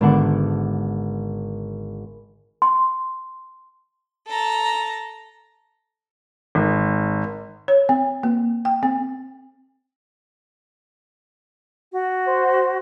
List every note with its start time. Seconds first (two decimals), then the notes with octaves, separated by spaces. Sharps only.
0.01 G#1 D3 B3 D4 F#5 D6
2.62 C6
4.28 A4 A#5
6.55 G#1
7.68 C#5
7.89 C4
8.23 A#3
8.65 G5
8.83 C4
11.92 F#4
12.27 C5